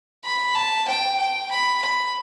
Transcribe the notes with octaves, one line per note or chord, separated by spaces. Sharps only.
B5
A5
G5
G5
B5
B5